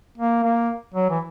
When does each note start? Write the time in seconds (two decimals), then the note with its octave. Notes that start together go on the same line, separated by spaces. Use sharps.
0.18 A#3
0.43 A#3
0.94 F#3
1.10 E3